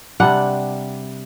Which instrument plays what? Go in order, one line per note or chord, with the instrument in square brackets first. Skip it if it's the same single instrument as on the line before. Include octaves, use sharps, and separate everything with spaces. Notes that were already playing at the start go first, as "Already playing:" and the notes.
[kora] C3 G3 D4 F#5